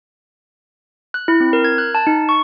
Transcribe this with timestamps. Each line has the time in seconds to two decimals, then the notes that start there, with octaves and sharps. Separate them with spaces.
1.14 F#6
1.28 E4
1.40 C4
1.53 A#4
1.64 G#6
1.78 F#6
1.95 A5
2.07 D#4
2.29 C#6